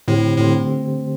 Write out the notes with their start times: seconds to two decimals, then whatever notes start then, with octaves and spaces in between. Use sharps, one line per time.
0.08 A2 D3 A3 C4 G4 C5
0.38 A2 D3 A3 C4 G4 C5